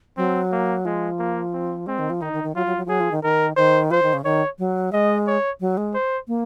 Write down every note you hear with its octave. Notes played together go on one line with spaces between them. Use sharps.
F#3 C4
A#3
F3 G#3
A#3
C4
G#3 C4
D#3
F3
D#3 D#4
D#3
D#3
F#3 F4
F#3
F#3
F3
F#3 G#4
F3
D#3
D#3 A#4
D#3 C5
F3 C5
D#3
C#3
D#3 C#5
F#3
G#3 D#5
C#5
F#3
G#3
C5
A#3